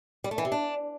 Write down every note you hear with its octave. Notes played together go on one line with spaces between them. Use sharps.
G3
A3
E3
C3
D4